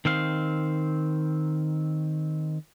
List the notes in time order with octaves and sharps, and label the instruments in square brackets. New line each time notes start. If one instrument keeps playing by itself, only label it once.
[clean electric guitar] D#3 C4 F5